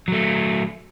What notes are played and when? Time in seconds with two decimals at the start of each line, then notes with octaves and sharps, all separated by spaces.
0.08 F#3 A3